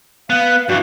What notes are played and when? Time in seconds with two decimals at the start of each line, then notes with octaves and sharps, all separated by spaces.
0.30 B3 F5
0.69 G2 E3 F#4